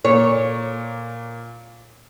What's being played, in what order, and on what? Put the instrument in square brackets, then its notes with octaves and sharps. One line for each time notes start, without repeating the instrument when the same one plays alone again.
[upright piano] A#2 A#3 [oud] C#5